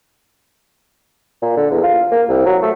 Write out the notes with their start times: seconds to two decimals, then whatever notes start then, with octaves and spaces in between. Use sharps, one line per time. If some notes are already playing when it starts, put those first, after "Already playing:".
1.42 A#2
1.57 D3
1.71 E2
1.83 F4
2.11 A#3
2.29 C2
2.46 F#3
2.62 A3